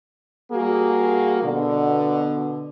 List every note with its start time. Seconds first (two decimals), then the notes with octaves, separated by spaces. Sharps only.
0.52 G3 A#3 F#4 G#4
1.43 B2 D3